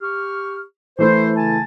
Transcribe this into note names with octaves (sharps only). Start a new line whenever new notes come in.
G4 C#6 F6
E3 A3 E4 C5
C#3 G#5 A5